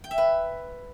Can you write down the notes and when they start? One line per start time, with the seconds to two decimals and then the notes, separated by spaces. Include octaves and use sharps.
0.04 G5
0.11 E5
0.18 B4